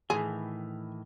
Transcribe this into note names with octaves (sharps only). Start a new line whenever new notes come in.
A2 D#3 E3 G#4